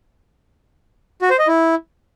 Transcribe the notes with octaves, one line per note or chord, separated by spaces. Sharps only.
F#4
C5
D#5
E4